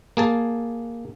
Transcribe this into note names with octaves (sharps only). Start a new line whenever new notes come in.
A#3 G#4 A5